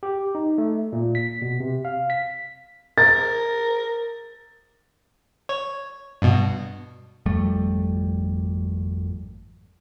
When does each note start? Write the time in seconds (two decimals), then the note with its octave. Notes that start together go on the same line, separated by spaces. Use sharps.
0.03 G4
0.35 D#4
0.58 A3
0.93 A#2
1.15 B6
1.42 B2
1.60 C3
1.85 F5
2.10 B6
2.98 A#4 A6
5.49 C#5
6.22 G2 B2
7.26 G#1 F2 G3 A3